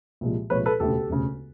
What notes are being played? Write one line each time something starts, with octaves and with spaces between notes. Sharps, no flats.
C2 A#2 F3 G#3
C2 A#2 F3 G#3 B4 C#5
A4 B4
E1 D2 C#3 G4 A4
E1 D2 C#3